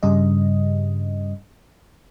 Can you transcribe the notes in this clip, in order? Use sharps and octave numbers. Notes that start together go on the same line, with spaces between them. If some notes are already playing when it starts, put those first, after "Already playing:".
G2 C#3 G3 D#5